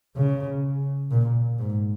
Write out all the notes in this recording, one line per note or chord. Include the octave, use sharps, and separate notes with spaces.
C#3
A#2
G#2